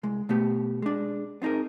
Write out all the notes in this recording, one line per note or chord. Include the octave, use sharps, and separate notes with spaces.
C2 G#3
B2 A3 B3 G4
G#3 D4
B3 C4 D#4 G#4 A#4